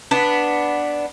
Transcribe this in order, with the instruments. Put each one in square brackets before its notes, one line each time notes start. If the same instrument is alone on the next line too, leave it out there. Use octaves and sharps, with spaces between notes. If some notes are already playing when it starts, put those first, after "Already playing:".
[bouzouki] B3 D4